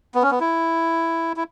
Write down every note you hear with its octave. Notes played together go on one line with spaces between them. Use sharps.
B3
C#4
B3
E4
E4